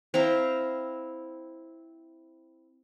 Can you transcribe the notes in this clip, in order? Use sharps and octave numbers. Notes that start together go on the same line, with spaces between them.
C4 E4 F5 A#5